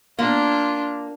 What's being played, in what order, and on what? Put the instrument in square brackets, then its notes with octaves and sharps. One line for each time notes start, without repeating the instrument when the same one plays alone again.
[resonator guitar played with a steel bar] A#3 [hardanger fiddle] D4 F4